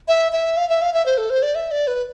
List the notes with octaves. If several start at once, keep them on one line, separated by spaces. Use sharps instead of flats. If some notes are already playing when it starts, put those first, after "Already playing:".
E5
E5
F5
E5
F5
E5
C5
A4
C5
D5
E5
D5
B4